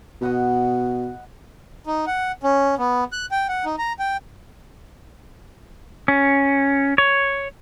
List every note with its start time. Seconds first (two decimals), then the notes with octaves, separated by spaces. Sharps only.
0.21 B2 D#5 F#5 B5
1.87 D#4
2.07 F#5
2.44 C#4
2.78 B3
3.12 F#6
3.31 G5
3.48 F#5
3.65 D#4
3.78 A#5
3.99 G5
6.08 C#4
6.98 C#5